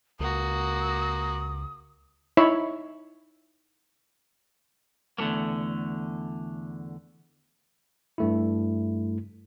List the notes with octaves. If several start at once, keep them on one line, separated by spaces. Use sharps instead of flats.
C#2 A#3 F#4 D#6
D#4 E4 C#5 E5 B5
E2 D3 F3 A3 A#3
G2 A3 E4